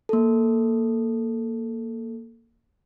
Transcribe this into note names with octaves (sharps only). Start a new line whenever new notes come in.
A#3 A4